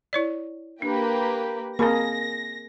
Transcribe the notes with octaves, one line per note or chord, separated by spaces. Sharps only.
E4 C#5 D5
A#3 D4 G4 B4
A#3 C4 G#4 A#4 B5 A#6